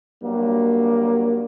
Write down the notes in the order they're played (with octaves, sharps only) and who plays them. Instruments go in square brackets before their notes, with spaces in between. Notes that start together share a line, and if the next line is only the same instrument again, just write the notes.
[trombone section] G2 F#3 A#3